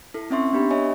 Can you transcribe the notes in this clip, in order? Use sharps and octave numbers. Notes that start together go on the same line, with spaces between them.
E4 A4
C4 C#4 E5 C6 C#6
B3 D4 G4 B5
C#5 D#5 E5 G#5 C#6